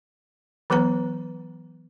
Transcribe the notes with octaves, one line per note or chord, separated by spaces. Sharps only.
E3 F#3 B3 B4 A#5